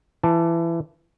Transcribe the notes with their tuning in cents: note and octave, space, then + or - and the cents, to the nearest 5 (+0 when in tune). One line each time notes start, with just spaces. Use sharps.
E3 +20 A5 +0